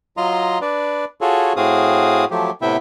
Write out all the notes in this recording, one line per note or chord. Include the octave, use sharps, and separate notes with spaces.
F#3 F4 D#5 A#5 C6
D4 B4 D5
F4 F#4 G#4 A4 C#5
A2 C4 F#4 G#4 F5 D#6
F3 F#3 A3 G4
A2 C3 B3 E4 E5 G5